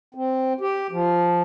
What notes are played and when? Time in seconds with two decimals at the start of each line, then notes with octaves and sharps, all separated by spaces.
0.15 C4
0.61 G4
0.92 F3